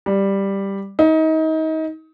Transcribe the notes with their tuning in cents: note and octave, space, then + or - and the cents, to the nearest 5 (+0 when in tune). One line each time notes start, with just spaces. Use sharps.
G3 +5
D#4 +30